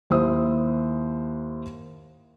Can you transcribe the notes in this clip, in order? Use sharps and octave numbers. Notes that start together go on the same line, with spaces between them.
D#2 E4 C5 D#6